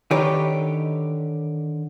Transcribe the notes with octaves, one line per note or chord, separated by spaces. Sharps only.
D3 D#3 D#4 G4 B4 C#5